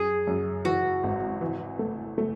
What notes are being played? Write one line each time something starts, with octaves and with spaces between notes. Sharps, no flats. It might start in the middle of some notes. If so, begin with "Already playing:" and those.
Already playing: F#2 G#4
F#2
E3 F#4
G#1
E3
A3
A3